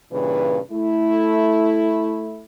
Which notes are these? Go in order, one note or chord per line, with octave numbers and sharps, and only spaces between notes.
G2 A#2 C#3 E3 B4
A3 E4